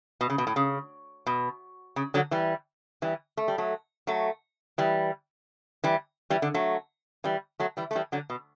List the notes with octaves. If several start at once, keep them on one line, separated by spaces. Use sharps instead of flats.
B2
C#3
B2
A2
C#3
B2
C#3
D3 F#3
E3 G3
E3 G3
A3
G3
F#3 A3
F#3 A3
E3 G3
E3 G3
E3 G3
D3
F#3 A3
E3 G3
F#3 A3
E3 G3
A3
E3 G3
D3 F#3
B2